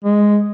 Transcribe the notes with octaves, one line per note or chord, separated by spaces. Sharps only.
G#3